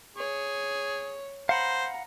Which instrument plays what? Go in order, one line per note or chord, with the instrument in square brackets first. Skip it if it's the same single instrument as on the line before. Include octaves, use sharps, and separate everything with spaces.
[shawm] G#4 [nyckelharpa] C#5
[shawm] C5 [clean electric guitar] F5 F#5 B5 [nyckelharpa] A#5